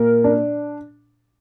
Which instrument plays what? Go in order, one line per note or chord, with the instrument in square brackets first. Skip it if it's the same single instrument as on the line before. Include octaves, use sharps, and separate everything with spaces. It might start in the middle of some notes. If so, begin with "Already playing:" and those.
Already playing: [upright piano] A#2 [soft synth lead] A#4
[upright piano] D4